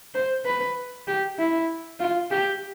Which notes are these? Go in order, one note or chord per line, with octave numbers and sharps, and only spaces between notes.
C5
B4
G4
E4
F4
G4